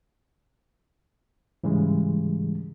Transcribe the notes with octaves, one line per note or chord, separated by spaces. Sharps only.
G#2 C#3 E3 G3 G#3